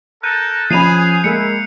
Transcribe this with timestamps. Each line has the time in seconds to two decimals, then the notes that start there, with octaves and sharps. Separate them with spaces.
0.23 A4 A#4 F#6 G6 D#7
0.70 F3 C#4 G#4 B5 C7 D#7 F7
1.24 G#3 A#3 E4 C#7